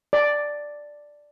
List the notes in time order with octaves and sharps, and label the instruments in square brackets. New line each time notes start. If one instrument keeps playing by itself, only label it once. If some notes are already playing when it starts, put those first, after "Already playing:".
[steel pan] D5